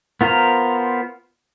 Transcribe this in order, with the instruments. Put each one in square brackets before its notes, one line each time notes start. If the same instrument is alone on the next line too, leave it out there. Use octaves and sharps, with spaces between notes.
[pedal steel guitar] B3 F4 A#4 C5 A#5